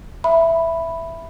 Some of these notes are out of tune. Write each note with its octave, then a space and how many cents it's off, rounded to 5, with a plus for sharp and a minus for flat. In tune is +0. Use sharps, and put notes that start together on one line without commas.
E5 +5 B5 +0